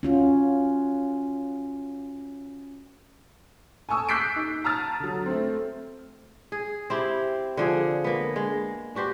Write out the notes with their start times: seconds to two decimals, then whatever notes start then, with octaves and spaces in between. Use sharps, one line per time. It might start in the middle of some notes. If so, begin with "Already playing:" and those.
0.03 C#4 F4 F#4
3.89 G#5 A5 C#6 D#6 E6
4.09 D6 F#6 G6 B6 C7 D7
4.36 D#4
4.64 A5 A#5 D#6 F6 A6
5.00 D3 F#3
5.26 A3 C4
6.52 G#4
6.90 C4 E4 G4
7.57 D3 F3 G#4
8.04 A#3 B3
8.36 G#3
8.95 D4 F#4 G4 C5